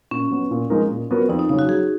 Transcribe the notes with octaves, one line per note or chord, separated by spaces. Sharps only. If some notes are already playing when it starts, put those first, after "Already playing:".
A#2 C#4
F#3 B3
A#2
F3 G#3 D#4 A#4
A#2
F#3 B3 F#4 A#4
F2 D#4
D#4
C#3 F#3 D#4
F#4
F#3 G#4